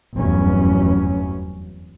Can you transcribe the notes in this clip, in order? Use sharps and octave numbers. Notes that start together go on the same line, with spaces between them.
F1 E2 G2 F#3 C#4